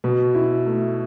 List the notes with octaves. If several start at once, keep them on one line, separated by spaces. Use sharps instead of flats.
B2
E4
A3